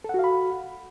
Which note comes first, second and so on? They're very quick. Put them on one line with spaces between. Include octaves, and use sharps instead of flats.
A4 F#5 F#4 F5 B5